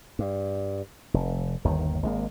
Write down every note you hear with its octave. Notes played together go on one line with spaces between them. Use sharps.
G2
F1
G1 D#2 D#3
G#1 G#3 A#3